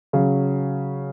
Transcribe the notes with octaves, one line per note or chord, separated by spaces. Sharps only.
C#3 F#3